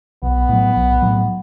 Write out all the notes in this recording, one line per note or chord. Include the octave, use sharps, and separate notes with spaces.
B1 B3
A2 F#3
B1
A2 F#3